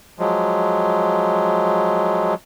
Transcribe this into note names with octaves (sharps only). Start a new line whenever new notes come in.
F3 F#3 G#3